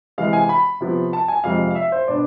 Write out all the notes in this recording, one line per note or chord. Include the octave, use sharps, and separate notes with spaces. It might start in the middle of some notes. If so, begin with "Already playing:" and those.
C3 E3 G#3 F5
G#5
B5
C3 F3 B3
A5
G#5
F2 C3 F3 G#3 F5
F5
E5
C5
B2 B3 D4 D5